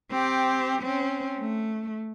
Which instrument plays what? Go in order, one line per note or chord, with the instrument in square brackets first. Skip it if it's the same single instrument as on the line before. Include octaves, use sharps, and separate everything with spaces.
[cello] C4 G4
C4 C#4
A3